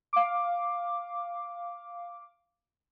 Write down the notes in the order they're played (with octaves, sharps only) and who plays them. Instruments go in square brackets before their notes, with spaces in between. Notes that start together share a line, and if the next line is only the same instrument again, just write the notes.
[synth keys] F5 D6